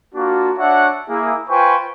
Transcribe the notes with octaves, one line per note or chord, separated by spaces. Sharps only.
A#3 D4 F4 F#4
D4 F#4 C#5 E5 F#5
A#3 E4 G#4
F4 B4 C5 G5 G#5 C#6